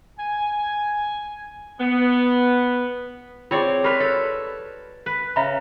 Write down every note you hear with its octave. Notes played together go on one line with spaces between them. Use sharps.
G#5
B3
C4 F4 G#4 C#5 D5
G4 A#4 B4 B5 C#6
A4 C#5
B4
C#3 E5 A#5 B5